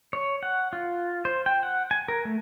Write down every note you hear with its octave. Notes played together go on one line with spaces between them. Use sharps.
C#5
F#5
F4
C5
G5
F#5
G#5
A#4
A3